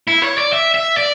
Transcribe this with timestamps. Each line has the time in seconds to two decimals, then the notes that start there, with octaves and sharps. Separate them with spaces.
0.07 E4
0.23 C#5
0.38 D5
0.52 E5
0.74 E5
0.97 D5